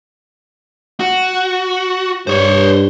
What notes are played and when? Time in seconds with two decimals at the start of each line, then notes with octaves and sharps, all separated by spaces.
1.00 F#4
2.27 G2 C5 C#5